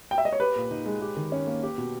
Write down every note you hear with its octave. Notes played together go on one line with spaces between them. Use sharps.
G5
E5
D#5
C#5
G4 B4
A#2
D#4
G#3
G4
D#3
C#4
A#3
G4
B2